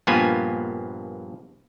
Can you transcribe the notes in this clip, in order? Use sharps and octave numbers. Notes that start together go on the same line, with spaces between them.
A#1 G2 A#3 B3 F4 G#5